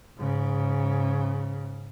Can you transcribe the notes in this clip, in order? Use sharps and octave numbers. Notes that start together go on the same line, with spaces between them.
G#2 C#3